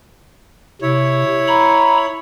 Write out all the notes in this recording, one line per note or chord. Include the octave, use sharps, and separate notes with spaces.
C3 E4 C#5
A#5 B5